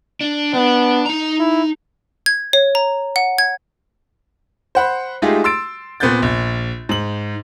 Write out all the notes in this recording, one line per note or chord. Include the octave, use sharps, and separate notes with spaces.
D4
B3 D4
D#4 A#5
E4
G#6
C#5
A#5
F#5
G#6
C5 F#5 B5
G#3 A3 D#4 F4 G4 G#4
C6 E6 A6 D7
A#2 B3 C4 F#6 G6 A6
A#1
G#2 F#7